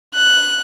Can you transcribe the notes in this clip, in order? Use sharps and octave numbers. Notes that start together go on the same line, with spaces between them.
F#6